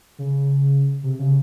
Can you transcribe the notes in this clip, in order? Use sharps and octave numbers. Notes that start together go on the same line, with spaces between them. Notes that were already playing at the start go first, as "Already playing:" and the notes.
C#3
C3
C#3